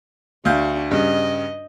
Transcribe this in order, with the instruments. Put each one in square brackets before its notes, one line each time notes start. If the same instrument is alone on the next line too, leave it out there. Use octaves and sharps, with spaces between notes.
[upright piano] D2 F5 G6 [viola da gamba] D4 F#4
[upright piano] G2 C#3 [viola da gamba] D#5